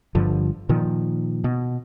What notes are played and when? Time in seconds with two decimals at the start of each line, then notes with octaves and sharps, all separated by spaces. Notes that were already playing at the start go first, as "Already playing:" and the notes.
0.15 G1 G2 D3 F3
0.69 A#2 D#3 F3
1.44 B2